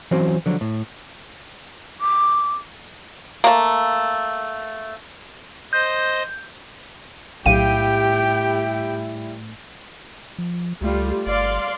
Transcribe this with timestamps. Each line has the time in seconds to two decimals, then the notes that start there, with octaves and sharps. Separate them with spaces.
0.11 E3 F#3 C4 C#4 F#4 C5
0.46 D3 F3 F#3
0.61 A2
2.01 D6
3.44 A3 A#3
5.73 C5 D#5 G6
7.46 B1 A2 G3 E4 G4 F5 G5 D#7
10.38 F3
10.81 C#2 G3 A3 F4
11.26 G1 D5 F5 C6